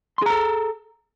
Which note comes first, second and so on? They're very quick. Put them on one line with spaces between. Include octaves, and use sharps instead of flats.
C6 G#4 A#5 A4